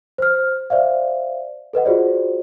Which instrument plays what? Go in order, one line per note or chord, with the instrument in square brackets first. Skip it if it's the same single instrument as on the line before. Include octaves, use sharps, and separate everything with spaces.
[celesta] C5 F6
C5 D5 E5 F5
A4 B4 D#5 F#5
F4 F#4 G#4 C5 D5